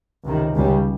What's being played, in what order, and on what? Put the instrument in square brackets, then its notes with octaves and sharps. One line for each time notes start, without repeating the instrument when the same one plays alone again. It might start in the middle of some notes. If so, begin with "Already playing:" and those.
[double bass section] C#2 C3 D#3
C#2 C#3 G3